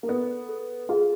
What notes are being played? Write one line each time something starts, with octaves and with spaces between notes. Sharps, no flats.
A#3
B3 A4
A4
F4 G#4